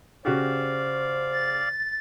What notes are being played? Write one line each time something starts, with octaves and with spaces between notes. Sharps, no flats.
C#3 F#4 G4 C5 D5 F5
A6